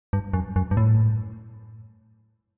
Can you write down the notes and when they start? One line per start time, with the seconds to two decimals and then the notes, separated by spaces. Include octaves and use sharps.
0.13 G2
0.33 F#2
0.56 F#2
0.71 G2
0.77 A2